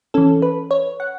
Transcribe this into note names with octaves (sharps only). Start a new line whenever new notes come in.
E3 C#4 A4
B4
C#5
F#5